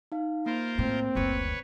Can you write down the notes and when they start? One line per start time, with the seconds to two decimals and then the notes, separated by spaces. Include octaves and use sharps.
0.12 D#4 F5
0.46 A#3 F4 A#4 C5
0.78 A2 C4
1.15 F#1 D2 B4 C#5